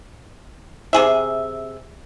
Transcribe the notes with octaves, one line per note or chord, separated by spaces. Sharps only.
C3 G#4 E5